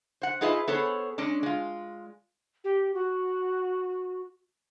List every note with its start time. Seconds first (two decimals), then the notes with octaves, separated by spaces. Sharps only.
0.22 C5 F#5
0.41 D#4 F4 G#4 B4 D#5 E5
0.68 B3 G#4 A4 C5 C#5
1.18 G#3 C#4 D4
1.43 G#3 F4
2.64 G4
2.94 F#4